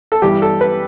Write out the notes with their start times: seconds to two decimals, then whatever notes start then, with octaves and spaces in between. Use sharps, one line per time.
0.12 A4
0.22 G2 E3 G3 G4
0.42 A4
0.61 B4